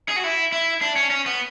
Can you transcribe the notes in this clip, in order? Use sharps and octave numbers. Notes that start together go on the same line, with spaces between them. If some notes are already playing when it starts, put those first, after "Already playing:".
G#4
F#4
E4
E4
D4
C#4
C#4
B3